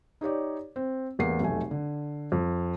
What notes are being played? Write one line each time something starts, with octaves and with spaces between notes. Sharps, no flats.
D#4 G4 C#5 D5
C4
A1 E2 A#3 C7
F1 B1 A3 G#5
D3
F2